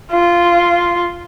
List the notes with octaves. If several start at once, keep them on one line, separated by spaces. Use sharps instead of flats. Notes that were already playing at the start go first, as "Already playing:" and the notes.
F4